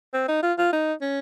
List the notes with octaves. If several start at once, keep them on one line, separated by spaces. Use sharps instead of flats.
C4
D#4
F4
F4
D#4
C#4